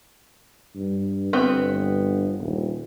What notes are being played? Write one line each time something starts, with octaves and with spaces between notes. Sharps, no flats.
G2
G1 B3 C4
D#1